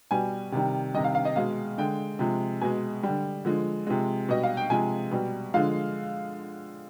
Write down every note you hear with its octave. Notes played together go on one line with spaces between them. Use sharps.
B2 G3 G#5
C3 D#3 G3
C3 D#3 G3 D#5
F5
F5
D#5
B2 G#3 F5
D3 G#3 G5
C3 F3 G#3
B2 G#3 G#5
D3 G3
D3 F3 G#3
C3 F3 G#3
B2 G3 D#5
F5
G5
C3 F3 G#3 G#5
B2 G3
D3 F3 G#3 F5